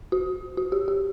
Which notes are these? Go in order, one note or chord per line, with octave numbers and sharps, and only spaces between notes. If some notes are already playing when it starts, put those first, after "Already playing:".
F#4
F#4
G4
G4